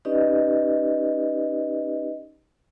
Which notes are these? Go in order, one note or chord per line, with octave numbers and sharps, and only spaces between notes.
C#4 D#4 G4 B4 D5 D#5